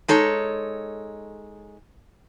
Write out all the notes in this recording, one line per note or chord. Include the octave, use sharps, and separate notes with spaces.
G#3 D#4 A4 C#5